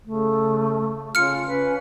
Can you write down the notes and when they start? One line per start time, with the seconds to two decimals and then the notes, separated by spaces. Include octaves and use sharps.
0.05 C#3 A3
1.15 C#3 F4 F6 C#7
1.47 C#4 B4